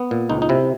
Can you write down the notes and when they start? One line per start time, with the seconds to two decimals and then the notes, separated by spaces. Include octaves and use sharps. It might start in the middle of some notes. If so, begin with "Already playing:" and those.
Already playing: B3
0.11 A#2
0.29 C#2 D#4
0.42 D#4
0.49 C3 E4